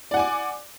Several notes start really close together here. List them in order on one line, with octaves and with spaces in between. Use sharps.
D5 F#5 G#5 D6